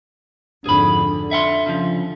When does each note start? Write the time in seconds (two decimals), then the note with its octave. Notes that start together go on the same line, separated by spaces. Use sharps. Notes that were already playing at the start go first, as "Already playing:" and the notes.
0.66 G#1 F2 D3 G#4 B5
1.01 D3
1.31 E5 F#5 C6
1.66 C#3 F3